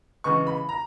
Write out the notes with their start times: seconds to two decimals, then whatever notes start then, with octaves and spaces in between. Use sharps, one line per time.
0.24 C#3 E3 G#3 B3 C#6
0.47 B5
0.69 A#5